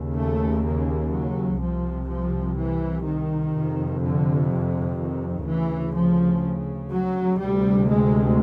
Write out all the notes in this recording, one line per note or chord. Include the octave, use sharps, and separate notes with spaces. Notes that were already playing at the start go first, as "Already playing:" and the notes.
Already playing: D#2 C#3
A3
A#3
F#3
C2 C3 F3
F3
E3
D#3
F2 C3
D3
D3
D#3
D2 C#3 E3
F3
F#3
D2 C3 G3
G#3